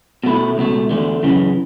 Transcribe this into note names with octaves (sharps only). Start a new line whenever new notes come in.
B2 A3 E4
C#2 B2 A3
E2 D3 A3
F#2 C#3 E3